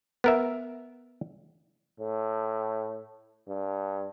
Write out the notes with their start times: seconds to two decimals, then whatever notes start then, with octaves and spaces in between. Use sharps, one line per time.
0.24 B3 A#4 E5
2.00 A2
3.49 G2